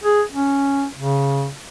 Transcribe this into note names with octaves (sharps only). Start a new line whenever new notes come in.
G#4
C#4
C#3